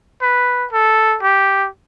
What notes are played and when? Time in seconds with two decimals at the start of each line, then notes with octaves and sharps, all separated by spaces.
0.22 B4
0.72 A4
1.22 G4